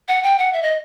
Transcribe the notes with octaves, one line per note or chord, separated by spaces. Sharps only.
F#5
G5
F#5
E5
D#5